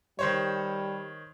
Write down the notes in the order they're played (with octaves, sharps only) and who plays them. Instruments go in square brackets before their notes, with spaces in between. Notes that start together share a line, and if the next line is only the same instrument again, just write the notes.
[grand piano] D#3 C5 C#5 [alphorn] G3